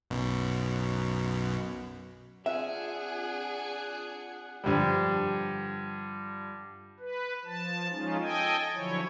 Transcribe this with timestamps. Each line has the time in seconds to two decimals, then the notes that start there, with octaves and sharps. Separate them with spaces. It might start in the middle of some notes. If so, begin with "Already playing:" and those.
0.10 B1 F#2 B2
2.46 C4 D4 F4 G#4 E5 F#5
4.64 G2 D3 F3 G3
6.99 B4
7.45 F3 A5
7.90 F3 G#3 C#4 D#4 F4
8.21 A4 D#5 G5 G#5
8.74 D3 F3 F#3 E4 C#5